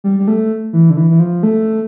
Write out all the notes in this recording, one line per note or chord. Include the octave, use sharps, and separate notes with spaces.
G3
G3
A3
E3
D3
E3
E3
F3
A3